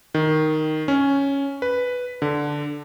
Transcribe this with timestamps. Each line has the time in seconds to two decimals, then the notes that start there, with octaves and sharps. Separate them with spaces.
0.15 D#3
0.88 C#4
1.62 B4
2.22 D3